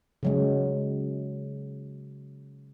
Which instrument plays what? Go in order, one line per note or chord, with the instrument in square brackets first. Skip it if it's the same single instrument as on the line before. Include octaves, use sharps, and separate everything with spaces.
[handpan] C#3 F#3 G#3